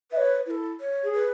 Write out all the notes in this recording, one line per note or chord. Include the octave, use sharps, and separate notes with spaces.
B4 C#5 E5
E4 A4 B4
C#5
G#4
B4